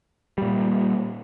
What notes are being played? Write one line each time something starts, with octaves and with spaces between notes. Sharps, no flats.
A#2 G3